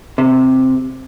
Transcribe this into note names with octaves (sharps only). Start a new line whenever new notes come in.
C3